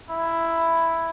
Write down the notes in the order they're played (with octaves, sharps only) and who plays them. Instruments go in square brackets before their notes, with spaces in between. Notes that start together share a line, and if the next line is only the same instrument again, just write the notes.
[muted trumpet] E4